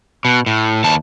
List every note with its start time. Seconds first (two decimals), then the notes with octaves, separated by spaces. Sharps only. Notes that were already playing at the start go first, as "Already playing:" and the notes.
0.25 B2
0.46 A2
0.84 D#2 A5